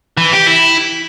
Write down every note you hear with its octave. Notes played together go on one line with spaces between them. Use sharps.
E3
G4
E4